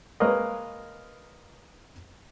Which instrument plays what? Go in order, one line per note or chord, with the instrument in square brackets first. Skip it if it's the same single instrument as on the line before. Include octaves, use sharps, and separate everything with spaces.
[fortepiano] G#3 A#3 A#4 B4 C#5 D#5